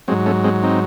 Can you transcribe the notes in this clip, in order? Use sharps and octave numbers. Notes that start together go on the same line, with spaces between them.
G#2 F#3 G#3 C4
A3 C#4
G#3 C4
C4 D#4